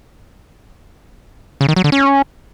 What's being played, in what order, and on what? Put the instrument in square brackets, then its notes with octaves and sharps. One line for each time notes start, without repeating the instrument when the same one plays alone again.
[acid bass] C#3
D#3
F#3
D3
C#4